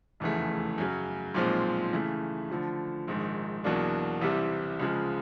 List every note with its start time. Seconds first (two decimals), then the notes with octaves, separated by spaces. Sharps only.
0.20 F1 E2 C#3 E3 A3
0.78 F#2 C#3 F#3
1.34 B1 A#2 F3 G#3 C4
1.93 C#3 E3 A3
2.50 D3 F3 A3
3.08 A#1 G#2 D#3
3.64 E2 B2 F#3 A#3 D4
4.21 C2 C3 E3 G3
4.79 C#2 C#3 F3 G#3